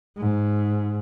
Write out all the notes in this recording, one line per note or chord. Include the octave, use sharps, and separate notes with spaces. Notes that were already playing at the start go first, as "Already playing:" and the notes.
G#2